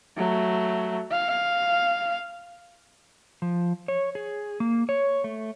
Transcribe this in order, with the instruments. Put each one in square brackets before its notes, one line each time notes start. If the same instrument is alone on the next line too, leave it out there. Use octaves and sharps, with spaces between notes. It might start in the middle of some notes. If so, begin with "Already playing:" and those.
[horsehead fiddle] F#3 A3
F5
[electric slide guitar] F3
C#5
G#4
A#3
C#5
A3